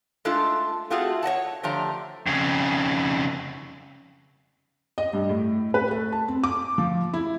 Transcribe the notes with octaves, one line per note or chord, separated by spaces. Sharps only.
G#3 A3 D4 F4 A4
A3 C4 F4 F#4 G#4 A4
C#5 D#5 F#5 A5
D3 F3 A3 G4 A#5
F2 C#3
D#5
G2
A2
B4
A3
A5
C4
D6
F3
E4